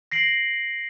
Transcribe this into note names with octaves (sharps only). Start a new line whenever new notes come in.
A#6 C7 D7 F#7